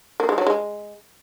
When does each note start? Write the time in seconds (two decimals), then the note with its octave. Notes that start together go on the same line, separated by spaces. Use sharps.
0.20 A#3
0.29 G#3
0.38 F#3
0.47 G#3